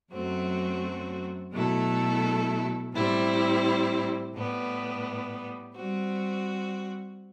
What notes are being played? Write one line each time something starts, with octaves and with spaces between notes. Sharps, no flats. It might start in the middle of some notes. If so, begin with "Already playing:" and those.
F#2 F#3 A3 C4 F#4
B2 F#3 A3 E4 A4
A2 G3 C4 E4
A2 G3 B3
G3 C4 F#4